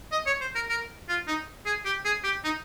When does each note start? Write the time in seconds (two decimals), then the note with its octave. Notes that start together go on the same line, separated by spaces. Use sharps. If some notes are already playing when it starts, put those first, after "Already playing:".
0.12 D#5
0.26 C#5
0.41 C5
0.55 A#4
0.69 A#4
1.09 F4
1.27 D#4
1.66 G#4
1.85 G4
2.05 G#4
2.24 G4
2.44 D#4